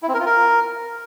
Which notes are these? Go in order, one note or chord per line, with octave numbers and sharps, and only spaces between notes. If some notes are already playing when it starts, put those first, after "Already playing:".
E4
C4
A#4
F4
A#4